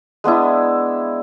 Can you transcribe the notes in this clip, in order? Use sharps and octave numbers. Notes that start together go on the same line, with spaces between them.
G#3 B3 D4 E4